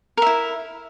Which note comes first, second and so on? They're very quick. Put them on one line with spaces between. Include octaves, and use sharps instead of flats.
A#4 E5 E4